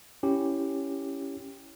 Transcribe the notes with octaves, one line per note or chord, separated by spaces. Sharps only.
C#4 E4 G4